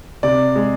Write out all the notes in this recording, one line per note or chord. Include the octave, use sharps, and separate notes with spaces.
C3 D5
G#3